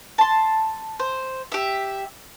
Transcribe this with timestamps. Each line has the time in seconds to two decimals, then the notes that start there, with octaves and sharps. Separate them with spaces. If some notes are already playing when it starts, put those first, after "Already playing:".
0.18 A5 C6
1.00 C5
1.52 G4 E5